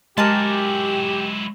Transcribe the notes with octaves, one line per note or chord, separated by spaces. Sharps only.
F#3 G#3 E4 G4 A#4 G#5 A5